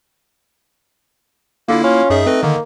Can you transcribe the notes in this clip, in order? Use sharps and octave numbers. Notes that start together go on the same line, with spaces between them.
D3 A#3 E4 F4
C#4 F4
F#2 D#4 G#4 E5
A3 C4 B4 D#5
D3 D#3 A#3